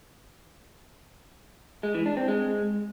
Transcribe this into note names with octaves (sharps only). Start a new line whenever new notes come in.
G#3
E3
D4
C4
G#3